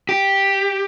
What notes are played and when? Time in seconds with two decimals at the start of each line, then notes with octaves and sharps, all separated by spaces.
0.09 G4